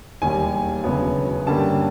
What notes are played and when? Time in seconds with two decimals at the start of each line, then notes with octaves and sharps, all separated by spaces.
0.22 E1 D#2 D#3 G3 G#5
0.84 E1 D2 C#3 F#3 B3
1.46 G2 D3 G3 A#3 C#4 A5